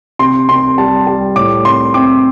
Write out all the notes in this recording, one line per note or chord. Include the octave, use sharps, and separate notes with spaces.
C3 C6
C3 C6
G3 A5
G3
A2 D6
C4 C6
C4 D6